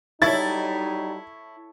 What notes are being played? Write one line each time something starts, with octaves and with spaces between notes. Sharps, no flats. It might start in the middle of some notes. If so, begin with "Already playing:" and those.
F#3 G3 D#4 E4 A4 C#5 A6